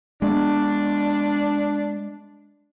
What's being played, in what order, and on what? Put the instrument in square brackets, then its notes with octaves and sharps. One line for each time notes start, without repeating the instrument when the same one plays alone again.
[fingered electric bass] G#3 A#3 B3 [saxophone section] D4